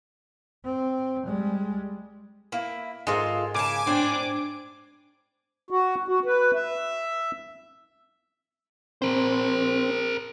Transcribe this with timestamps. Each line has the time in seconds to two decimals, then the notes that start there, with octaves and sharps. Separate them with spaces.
0.64 C4
1.27 G3 G#3
2.52 A#3 E4
3.07 G#2 G#3 F4 A4 A#4
3.54 C#3 G#5 A5 D6
3.87 A2 C4 D4 C5
5.71 F#4
6.08 F#4
6.25 B4
6.55 E5
9.02 C4 A#4 C5